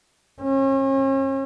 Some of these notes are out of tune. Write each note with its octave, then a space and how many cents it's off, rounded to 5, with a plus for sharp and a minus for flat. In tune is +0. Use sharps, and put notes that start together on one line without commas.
C#4 -40